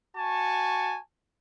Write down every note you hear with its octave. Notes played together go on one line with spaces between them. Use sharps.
F#4 G#5 A5 C#6